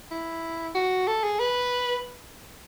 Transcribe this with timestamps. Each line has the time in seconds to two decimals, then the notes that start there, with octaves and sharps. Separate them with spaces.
0.11 E4
0.75 F#4
1.07 A4
1.23 G#4
1.40 B4